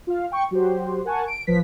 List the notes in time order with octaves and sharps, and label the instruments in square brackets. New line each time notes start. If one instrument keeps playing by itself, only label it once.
[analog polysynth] F4 F5
G5 C#6
F#3 F#4 G4 C5
A#4 F#5 G#5 A5 C#6
D7
A1 F3 B4 B6